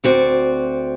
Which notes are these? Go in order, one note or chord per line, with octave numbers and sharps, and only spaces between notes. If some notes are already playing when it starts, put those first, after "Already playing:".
D2 C4 F#4 D5